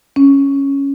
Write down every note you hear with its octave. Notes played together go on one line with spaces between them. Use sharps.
C#4